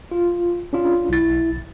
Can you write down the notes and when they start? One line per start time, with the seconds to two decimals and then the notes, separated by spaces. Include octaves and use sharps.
0.11 F4
0.73 C#4 D4 F4
1.09 B1 E4 A6